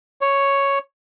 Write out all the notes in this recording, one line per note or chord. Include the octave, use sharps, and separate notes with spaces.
C#5